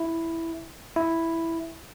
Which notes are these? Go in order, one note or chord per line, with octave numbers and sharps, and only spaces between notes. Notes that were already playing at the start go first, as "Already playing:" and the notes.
Already playing: E4
E4